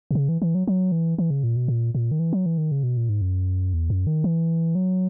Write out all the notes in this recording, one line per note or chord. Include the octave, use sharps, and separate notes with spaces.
B2
C#3
E3
E3
F#3
F#3
E3
E3
C#3
A#2
B2
A#2
A#2
D#3
E3
F#3
E3
D#3
C#3
B2
A#2
G#2
F#2
E2
F#2
D#3
E3
F#3